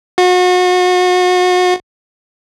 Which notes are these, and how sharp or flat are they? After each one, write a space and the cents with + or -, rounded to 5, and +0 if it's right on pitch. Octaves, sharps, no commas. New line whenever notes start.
F#4 -35